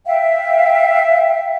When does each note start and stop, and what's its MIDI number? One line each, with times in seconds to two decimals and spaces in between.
0.06 1.57 76
0.06 1.57 77
0.06 1.57 79